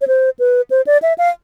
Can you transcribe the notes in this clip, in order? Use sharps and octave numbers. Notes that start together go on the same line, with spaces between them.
C#5
C5
B4
C5
D5
E5
F5